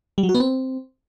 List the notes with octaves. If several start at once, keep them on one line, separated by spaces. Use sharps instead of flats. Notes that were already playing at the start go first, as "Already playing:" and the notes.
G3
F#3
F#4
B3
C4